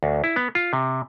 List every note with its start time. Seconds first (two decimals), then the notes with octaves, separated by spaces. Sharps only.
0.03 D2
0.24 E4
0.36 B3
0.55 F4
0.73 C3